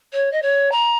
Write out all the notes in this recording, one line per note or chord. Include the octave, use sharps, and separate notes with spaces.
C#5
D#5
C#5
A#5